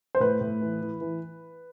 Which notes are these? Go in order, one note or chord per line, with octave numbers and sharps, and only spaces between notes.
C5
A2 B4
A2
E3
E3
E3